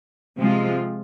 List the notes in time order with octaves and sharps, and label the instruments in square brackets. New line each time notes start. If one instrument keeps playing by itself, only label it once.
[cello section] C3 F3 G#3 C4 F4